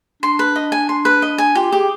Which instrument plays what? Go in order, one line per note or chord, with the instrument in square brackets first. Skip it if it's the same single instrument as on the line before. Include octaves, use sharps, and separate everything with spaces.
[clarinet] D4 [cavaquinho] C6
[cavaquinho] B4
D#5
G#5
C6
B4
D#5
G#5
[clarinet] F4 [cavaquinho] G4
[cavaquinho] G4 [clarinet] G#4